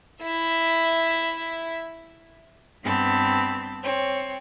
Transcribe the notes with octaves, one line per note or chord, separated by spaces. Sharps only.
E4 E5
G2 B3 C4 A5 B5
C4 C#5